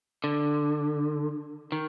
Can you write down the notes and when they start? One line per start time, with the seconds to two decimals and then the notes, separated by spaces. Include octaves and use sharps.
0.24 D3
1.72 D#3